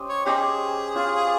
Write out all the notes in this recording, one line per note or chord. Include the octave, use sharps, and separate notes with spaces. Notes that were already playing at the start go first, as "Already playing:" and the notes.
Already playing: C#4 G4 C5 D#5
C#5
C#4 D#4 G4 G#4 C5 D#5
C#4 F4 C5